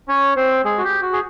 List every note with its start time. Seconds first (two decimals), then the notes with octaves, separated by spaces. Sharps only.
0.08 C#4 C#5
0.36 C4 C5
0.64 G#3 G#4
0.78 F#4
0.84 G4
1.02 F#4
1.13 G#4